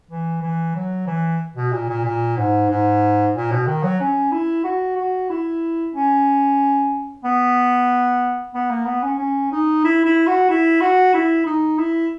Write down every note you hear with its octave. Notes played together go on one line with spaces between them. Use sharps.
E3
E3
F#3
E3
B2
A#2
A#2
A#2
G#2
G#2
A#2
B2
D#3
F#3
C#4
E4
F#4
F#4
E4
C#4
B3
B3
A#3
B3
C#4
C#4
D#4
E4
E4
F#4
E4
F#4
E4
D#4
E4